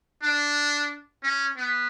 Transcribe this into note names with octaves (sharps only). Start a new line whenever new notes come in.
D4
C#4
B3